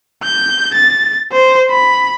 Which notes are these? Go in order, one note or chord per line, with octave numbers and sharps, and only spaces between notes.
G6
A6
C5
B5